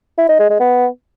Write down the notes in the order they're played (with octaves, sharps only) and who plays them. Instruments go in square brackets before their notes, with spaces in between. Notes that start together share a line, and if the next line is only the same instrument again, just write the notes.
[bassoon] E4
D#4
G#3
G#3
B3